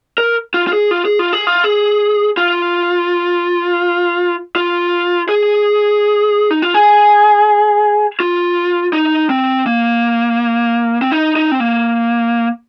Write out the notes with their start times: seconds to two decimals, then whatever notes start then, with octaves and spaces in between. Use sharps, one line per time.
0.18 A#4
0.54 F4
0.67 F4
0.73 G#4
0.91 F4
1.05 G#4
1.19 F4
1.33 G#4
1.47 F4
1.64 G#4
2.37 F4
4.56 F4
5.29 G#4
6.51 D#4
6.62 F4
6.74 G#4
8.20 F4
8.93 D#4
9.29 C4
9.66 A#3
11.02 C4
11.12 D#4
11.36 D#4
11.52 C4
11.60 A#3